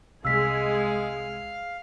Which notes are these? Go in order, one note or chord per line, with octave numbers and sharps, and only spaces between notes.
C2 C3 G#3 G#4 F5 E6 B6